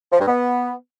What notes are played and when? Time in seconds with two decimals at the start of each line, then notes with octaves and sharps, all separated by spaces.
0.12 F3
0.19 G2
0.27 B3